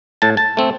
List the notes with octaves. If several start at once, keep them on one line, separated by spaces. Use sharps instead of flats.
A2 A5
A5
A3 C4